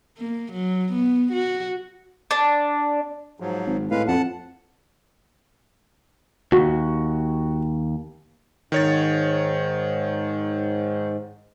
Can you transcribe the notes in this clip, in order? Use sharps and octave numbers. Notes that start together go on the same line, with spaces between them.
A#3
F#3
B3
F#4
D4
G#2 F3 F#3
G#1
A2 G#3 B4 F5
F2 F#5 A5
D#2 F#4
G#2 D#3 C#5 A6